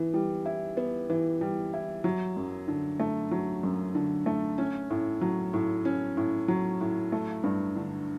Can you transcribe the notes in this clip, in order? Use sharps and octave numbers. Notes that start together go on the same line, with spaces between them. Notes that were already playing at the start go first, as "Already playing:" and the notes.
Already playing: E3 B3
G3
E4
B3
E3
G3
E4
F#3
F#2
D3
A3
F#3
F#2
D3
A3
C#4
A2
F#3
A2
C#4
A2
F#3
A2
A3
G2
D3